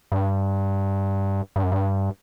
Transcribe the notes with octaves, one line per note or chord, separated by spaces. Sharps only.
G2
G2
F#2
G2